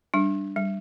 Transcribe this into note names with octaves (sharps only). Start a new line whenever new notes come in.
G3 D4
G3